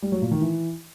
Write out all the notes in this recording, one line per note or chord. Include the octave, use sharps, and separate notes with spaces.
G3
F#3
A#2
D#3
E3